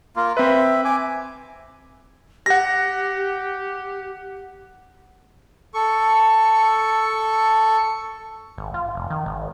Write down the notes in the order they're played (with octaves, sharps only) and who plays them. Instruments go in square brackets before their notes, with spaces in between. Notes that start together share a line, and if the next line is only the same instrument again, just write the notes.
[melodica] A#3 F4
[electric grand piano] C4 B4 [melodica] E5
[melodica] G#5 D6
[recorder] G4 [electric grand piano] F#5 A#6
[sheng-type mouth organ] A4 C#6
[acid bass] G#1
F4
F1
D#3
G#1